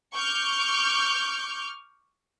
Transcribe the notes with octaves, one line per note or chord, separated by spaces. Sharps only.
C#6 D6 F6 G6